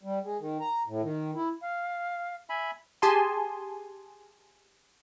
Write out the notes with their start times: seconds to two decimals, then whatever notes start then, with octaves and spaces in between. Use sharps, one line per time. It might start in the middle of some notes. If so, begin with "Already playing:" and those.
0.03 G3
0.24 G#3
0.40 D#3
0.60 A#5
0.87 A2
1.02 D#3
1.35 E4
1.62 F5
2.49 E5 G#5 B5
3.02 G4 G#4 G#5 A5 C6